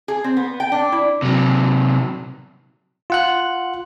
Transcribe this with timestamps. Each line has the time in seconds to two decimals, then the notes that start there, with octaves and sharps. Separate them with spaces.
0.08 G#4
0.24 C4
0.37 B3
0.60 G5
0.72 D4
0.92 E4
1.22 C3 F#3
3.10 F4 F#5 F#6